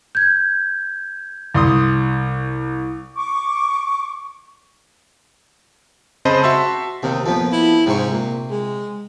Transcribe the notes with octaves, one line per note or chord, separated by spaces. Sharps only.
G6 G#6
C2 C6 D#6
C#6 D6
C#3 C4 C5 D#5 A5 B5
F#4 E5 A5 C6 E6
D#2 C3
F2 A#2 B3
E4
G#2 C3 C#6
A#2
G#3